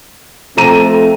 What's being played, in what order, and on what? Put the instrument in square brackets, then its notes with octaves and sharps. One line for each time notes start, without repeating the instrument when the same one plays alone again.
[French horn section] F3 A3 C4 [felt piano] A4 A#5 D#7